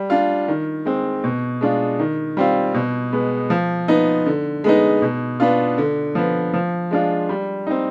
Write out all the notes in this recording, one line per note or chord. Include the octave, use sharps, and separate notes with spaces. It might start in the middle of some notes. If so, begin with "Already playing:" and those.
Already playing: G3
D4 F4
D#3
G#3 C4
B2
G#3 D4 F4
D#3
G3 C4 F4
B2
G#3 B3
F3
B3 D#4
D3
G#3 B3 D#4
B2
B3 D4 F4
D3
F3 B3
F3
G#3 D4 F4
G3
C4 D#4